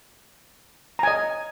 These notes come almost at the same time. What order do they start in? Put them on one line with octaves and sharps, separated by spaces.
A#5 G#5 D#5